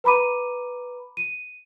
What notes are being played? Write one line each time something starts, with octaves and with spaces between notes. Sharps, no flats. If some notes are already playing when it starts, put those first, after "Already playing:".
B4 A#5 B5 D6 D#7
D#7